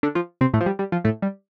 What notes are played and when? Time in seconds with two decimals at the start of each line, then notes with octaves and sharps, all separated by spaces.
0.03 D3 D4
0.15 F3 F4
0.41 C3 C4
0.54 A2 A3
0.61 F3
0.66 G3
0.79 G3
0.92 F3
1.04 A2 A3
1.22 G3